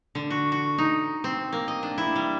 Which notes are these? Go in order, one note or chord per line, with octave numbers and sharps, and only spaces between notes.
D3
F#4
F#4
D#4
C4
A#3
D#5
D4
E4
G3